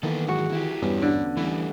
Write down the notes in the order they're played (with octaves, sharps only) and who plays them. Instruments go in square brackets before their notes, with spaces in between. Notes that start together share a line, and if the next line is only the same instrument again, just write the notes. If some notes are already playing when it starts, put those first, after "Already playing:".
[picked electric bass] D#3 E3 [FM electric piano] A#3 [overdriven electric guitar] B3 A4
[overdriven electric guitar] G#2 F#3 [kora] F#4 F#5 [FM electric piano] G#4
[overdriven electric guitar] E4 G4
[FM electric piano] E2 B3 C#4 [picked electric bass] G2 G3
[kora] D3
[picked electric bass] E3 [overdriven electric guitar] G3 A3